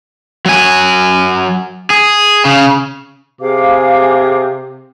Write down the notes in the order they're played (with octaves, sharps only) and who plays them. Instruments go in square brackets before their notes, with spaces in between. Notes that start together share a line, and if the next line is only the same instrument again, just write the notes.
[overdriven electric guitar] F#3 G#5
G#4
C#3
[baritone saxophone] C3 [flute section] G#4 F5 D6